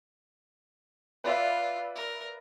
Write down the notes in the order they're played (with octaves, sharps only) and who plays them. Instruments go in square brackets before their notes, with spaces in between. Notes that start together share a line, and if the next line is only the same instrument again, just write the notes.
[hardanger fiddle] F4 [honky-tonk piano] B4 D5 E5
[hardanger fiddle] A#4